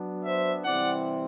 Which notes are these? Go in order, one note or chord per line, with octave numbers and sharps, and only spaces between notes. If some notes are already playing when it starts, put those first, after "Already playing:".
Already playing: F#3 B3 D4
C5 E5
C3 E3 G3 C4 E4 D5 F#5